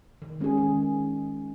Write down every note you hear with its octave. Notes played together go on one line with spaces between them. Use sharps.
D#3
G#3 C#4 G#4
D#3